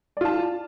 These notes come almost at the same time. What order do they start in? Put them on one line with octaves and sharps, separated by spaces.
D5 F4 A5